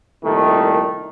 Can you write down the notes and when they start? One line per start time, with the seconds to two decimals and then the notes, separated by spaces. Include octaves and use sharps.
0.24 C2 A#2 D#3 A3